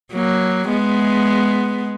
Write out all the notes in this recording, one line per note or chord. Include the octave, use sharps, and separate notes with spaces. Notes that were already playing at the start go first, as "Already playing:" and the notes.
F#3 A#3
G#3 B3